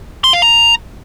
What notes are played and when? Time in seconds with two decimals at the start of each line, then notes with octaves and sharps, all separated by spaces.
0.24 C6
0.33 F5
0.42 A#5